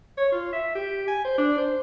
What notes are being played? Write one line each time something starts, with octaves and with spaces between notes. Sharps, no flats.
C#5
F4
E5
G4
G#5
C5
D4
C5